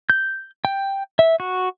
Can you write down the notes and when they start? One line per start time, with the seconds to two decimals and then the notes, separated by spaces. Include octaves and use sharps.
0.10 G6
0.65 G5
1.19 E5
1.40 F#4